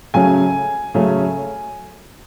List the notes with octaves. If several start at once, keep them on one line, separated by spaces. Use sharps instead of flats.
C#3 F#3 A3 C#4 G#5
C#3 F#3 A3 C#4